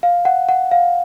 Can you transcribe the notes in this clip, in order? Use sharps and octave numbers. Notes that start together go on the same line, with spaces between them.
F5
F#5
F#5
F5